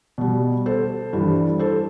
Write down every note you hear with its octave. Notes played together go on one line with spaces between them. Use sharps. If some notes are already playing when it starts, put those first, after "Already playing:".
B2 G3
A4 C5
G2 E3 G3
A4 C5